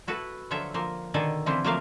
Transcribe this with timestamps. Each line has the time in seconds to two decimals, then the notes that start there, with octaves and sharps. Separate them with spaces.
0.07 E4 F#4 A4 B4
0.51 D3 F3 F#3 A4 C#5 E5
0.74 F3 A#3
1.14 B2 D3 D#3 A4 D5 G#5
1.46 D3 E3 F3 C4 E4
1.64 F3 F#3 A3 A#3 D5 F5